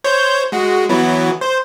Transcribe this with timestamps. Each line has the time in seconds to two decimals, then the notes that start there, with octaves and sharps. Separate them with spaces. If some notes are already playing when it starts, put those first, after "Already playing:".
0.04 C5 C#5 G6
0.52 G#3 F#4
0.89 E3 F#3 B3
1.41 C5